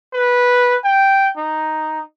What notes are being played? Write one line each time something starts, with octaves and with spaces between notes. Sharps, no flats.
B4
G5
D#4